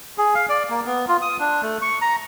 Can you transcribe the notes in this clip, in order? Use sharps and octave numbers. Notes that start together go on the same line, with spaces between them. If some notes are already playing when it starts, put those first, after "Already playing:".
G#4
F5
D5
A#3
B3
F4
D#6
D4
A3
C#6
A#5